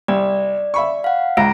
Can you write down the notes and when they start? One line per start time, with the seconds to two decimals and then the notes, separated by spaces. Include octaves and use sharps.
0.08 C2 D5
0.74 E5 B5 C#6
1.04 F5 F#5
1.37 C#2 A#5 A#6 D7